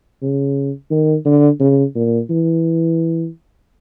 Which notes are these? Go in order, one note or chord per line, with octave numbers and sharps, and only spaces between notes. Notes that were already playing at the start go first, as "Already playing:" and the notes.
C#3
D#3
D3
C#3
A#2
E3